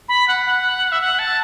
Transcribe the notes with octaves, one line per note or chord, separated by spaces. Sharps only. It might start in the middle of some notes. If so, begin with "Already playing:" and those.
B5
F#5
F#5
E5
F#5
A5